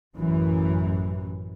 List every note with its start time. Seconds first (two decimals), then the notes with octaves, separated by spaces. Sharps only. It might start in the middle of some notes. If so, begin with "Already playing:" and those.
0.14 A1 F#2 E3